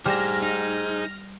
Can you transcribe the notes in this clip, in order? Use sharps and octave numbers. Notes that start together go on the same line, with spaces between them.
G3 G#4 C5 F6 A#6 E7
D#4